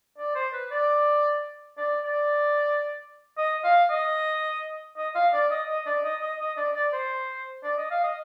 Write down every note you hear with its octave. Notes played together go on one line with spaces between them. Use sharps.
D5
C5
B4
D5
D5
D5
D#5
F5
D#5
D#5
F5
D5
D#5
D#5
D5
D#5
D#5
D#5
D5
D5
C5
D5
D#5
F5
D#5